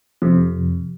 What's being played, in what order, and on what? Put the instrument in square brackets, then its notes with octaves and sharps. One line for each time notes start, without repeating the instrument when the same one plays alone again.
[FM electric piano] F2 C3